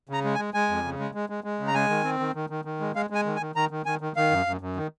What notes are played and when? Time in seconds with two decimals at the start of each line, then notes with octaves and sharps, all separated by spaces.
0.09 C#3 A#5
0.24 G#3
0.35 G#5
0.39 G#3
0.54 G#3 G#5
0.69 F2
0.84 C#3
1.00 G#3
1.14 G#3
1.29 G#3
1.44 G#3
1.60 C#3
1.67 A#5
1.74 G#3 G#5
1.90 D#3
2.04 C4
2.20 D#3
2.35 D#3
2.50 D#3
2.65 D#3
2.81 G#3
2.95 G#3 F5
3.10 G#3 G#5
3.26 D#3
3.36 G#5
3.41 D#3
3.55 D#3 A#5
3.71 D#3
3.86 D#3 G#5
4.01 D#3
4.16 D#3 F5
4.31 F#2
4.46 F#2
4.61 F#2
4.76 D#3